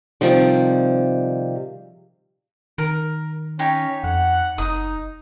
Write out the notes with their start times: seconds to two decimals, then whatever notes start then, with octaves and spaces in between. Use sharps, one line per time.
0.21 C3 D#3 F3 G3
2.78 D#3 A#4
3.59 C#4 D#4 G4 C#5
4.04 F2 F#5
4.58 F#1 D#4 D#6